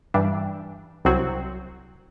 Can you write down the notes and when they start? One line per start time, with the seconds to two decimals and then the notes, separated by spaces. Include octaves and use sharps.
0.14 G2 E3 G3 D4
1.05 C2 C3 F#3 C4 F#4